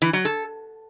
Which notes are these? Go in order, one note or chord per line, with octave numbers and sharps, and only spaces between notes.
E3
F#3
A4